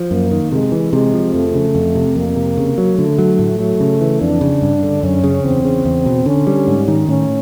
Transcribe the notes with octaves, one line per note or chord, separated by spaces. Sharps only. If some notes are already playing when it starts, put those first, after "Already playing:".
Already playing: F3
F#2 A#3
D#3
C3 G#3
E3
C3 G#3
F3
F2 A3
C#3
F2
C3
F2 A#3
C3
C#3
F#3
D3 A3
F#3
A2
F#3
C#3
E3
F2 D4
C#3
G2
D3
F#2 C#4
C#3
E2 C4
C#3
E2
B2
D3 C#4
G3
G#2
D#3
A2 C#4